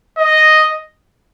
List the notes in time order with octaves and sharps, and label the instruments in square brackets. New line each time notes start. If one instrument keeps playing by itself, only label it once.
[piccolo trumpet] D#5